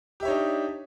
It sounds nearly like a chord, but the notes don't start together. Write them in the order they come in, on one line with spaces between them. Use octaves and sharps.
G4 E5 C#5 D#4 D4